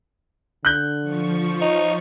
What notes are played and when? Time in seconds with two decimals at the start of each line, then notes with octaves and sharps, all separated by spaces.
0.65 D3 F#6 G6
1.02 F3 C#6
1.61 D#4